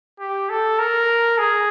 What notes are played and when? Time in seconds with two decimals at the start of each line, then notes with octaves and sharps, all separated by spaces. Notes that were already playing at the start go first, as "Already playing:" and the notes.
0.20 G4
0.50 A4
0.79 A#4
1.38 G#4